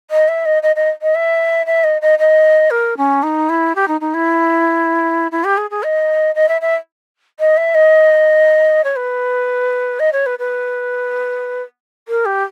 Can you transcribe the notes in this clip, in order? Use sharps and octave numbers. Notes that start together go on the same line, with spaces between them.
D#5
E5
D#5
D#5
D#5
D#5
E5
E5
D#5
D#5
D#5
A#4
C#4
D#4
E4
G4
D#4
D#4
E4
E4
G4
G#4
G#4
D#5
D#5
E5
E5
D#5
E5
D#5
C#5
B4
D#5
C#5
B4
B4
A#4
G4